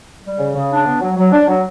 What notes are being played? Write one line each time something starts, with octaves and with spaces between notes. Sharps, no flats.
G3
C#3
C#3
D4
B3
F#3
F#3
D4
F#3